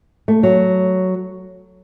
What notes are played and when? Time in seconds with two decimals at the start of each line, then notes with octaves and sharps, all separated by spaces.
0.28 A3
0.43 F#3